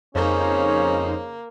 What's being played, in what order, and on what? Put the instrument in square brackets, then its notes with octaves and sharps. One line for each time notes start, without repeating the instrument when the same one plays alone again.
[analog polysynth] F2 D#4 C5 [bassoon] C#3 [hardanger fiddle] A#3 [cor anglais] C#4